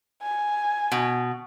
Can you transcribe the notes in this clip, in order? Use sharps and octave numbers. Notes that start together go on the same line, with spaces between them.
G#5
B2